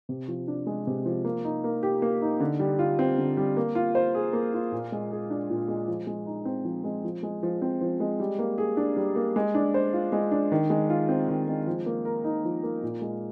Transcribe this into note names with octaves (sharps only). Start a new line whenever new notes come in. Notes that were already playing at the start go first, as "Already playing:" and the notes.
C3
F3
D4
G#3
C3
F3
A#3
D#4
A#3
G4
A#3
D#4
D3
G3
F4
C4
D3
G3
A#3
F4
C5
G#4
A#3
F4
A#2
G#3
G#4
D4
A#2
G#3
F3
G#3
D#4
C4
F3
G#3
F3
G#3
F3
C4
F3
G#3
G3
A#3
G#4
D4
G3
A#3
G#3
D4
C5
F4
G#3
D4
D#3
G#3
F4
C4
D#3
G#3
F3
A#3
A#4
D#4
F3
A#3
A#2
G#3